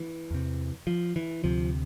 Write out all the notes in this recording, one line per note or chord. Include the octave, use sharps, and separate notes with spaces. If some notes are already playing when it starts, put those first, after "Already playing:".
Already playing: E3
E2 C3
F3
E3
D2 C3 F3